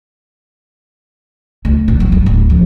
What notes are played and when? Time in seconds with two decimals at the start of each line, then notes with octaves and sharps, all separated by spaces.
1.65 D2
1.88 A#2
2.00 F#3
2.12 G2
2.26 D1
2.50 F3